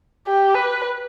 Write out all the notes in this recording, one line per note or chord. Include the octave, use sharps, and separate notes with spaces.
G4
B4